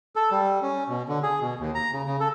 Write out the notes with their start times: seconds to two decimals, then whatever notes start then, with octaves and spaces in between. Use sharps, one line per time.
0.16 A4
0.31 G3
0.62 C#4
0.89 B2
1.09 D3
1.23 G#4
1.41 B2
1.59 D#2
1.75 A#5
1.93 C#3
2.06 C#3
2.20 A4